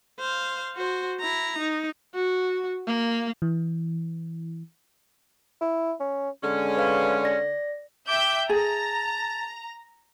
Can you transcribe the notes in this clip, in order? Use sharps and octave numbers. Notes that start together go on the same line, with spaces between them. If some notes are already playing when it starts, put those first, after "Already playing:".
C5 F5
F#4 C5
E4 A#5
D#4
F#4
A#3
E3
E4
C#4
D3 G#3 C#4
B4 D5 F5
D5 A#6
E5 G5 D6 G6
G#4 A5 A#5